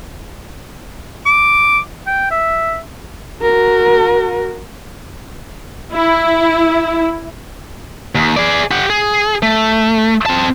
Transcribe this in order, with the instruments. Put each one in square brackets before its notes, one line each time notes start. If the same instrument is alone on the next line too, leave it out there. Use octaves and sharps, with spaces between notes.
[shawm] D6
G5
E5
[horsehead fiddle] F#4 A#4
[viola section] E4
[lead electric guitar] D#2
G#4 D5
G4 F#5
G#4
A3
C4 A5